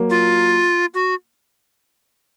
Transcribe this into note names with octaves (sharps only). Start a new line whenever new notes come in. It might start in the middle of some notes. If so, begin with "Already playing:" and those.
Already playing: F#3 A#3
F4
F#4